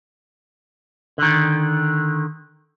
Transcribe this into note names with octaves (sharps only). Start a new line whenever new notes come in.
D3 D#3